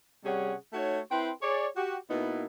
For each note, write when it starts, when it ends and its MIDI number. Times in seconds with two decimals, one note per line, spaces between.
0.24 0.54 48
0.24 0.54 55
0.24 0.54 61
0.24 0.54 68
0.24 0.54 73
0.24 0.54 78
0.73 1.00 57
0.73 1.00 63
0.73 1.00 66
0.73 1.00 73
1.10 1.30 60
1.10 1.30 64
1.10 1.30 71
1.10 1.30 79
1.10 1.30 84
1.41 1.66 68
1.41 1.66 73
1.41 1.66 74
1.76 1.97 66
1.76 1.97 67
2.09 2.45 47
2.09 2.45 58
2.09 2.45 59
2.09 2.45 63
2.09 2.45 64